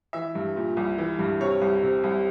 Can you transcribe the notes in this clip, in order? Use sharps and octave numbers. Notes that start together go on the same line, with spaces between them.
E3 E5
G2
A#2
C2
E3
G2
C3 C#5
C2
C3
C2